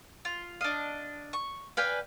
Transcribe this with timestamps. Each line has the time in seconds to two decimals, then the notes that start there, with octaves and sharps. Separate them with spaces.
0.25 F4
0.61 D4 D#5 F5
1.33 C#6
1.77 B4 D5 F5 G5 G#5